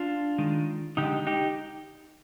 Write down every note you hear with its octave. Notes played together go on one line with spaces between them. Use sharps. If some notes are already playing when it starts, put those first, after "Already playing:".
Already playing: D4 F4
D#3 G#3
D3 G#3 D#4 G4
D#4 G4